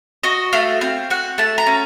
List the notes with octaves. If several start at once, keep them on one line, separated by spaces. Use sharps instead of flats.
F#4 D#5
A3 F5
C4 F5
F#4 F#5
A3 A5
A#5
C#4